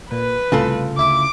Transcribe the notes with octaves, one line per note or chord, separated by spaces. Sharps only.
A#2 B4
C2 A2 C#3 F4 A4
D2 E4 E5 D6